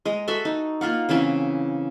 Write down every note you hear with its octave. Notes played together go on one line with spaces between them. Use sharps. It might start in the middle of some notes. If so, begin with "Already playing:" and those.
G#3 D#5 A#5
F#4 A4 E5 C6
D#4
A#3 F4 F5 F#5
C#3 E3 C4 C#4